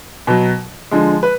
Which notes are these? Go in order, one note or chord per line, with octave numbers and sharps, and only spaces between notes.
B2 F#3
D3 F3 G#3
B4